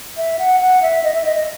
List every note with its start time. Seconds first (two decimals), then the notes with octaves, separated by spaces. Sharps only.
0.17 E5
0.39 F#5
0.60 F#5
0.82 E5
1.04 D#5
1.14 E5
1.25 D#5
1.36 D#5